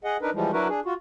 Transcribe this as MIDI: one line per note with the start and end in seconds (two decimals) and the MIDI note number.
0.04 0.17 68
0.04 0.17 75
0.04 0.17 78
0.22 0.30 62
0.22 0.30 63
0.22 0.30 70
0.22 0.30 71
0.34 0.51 52
0.34 0.51 53
0.34 0.51 55
0.34 0.51 56
0.53 0.68 54
0.53 0.68 62
0.53 0.68 64
0.53 0.68 66
0.53 0.68 70
0.53 0.68 71
0.69 0.80 62
0.69 0.80 68
0.85 0.94 65
0.85 0.94 66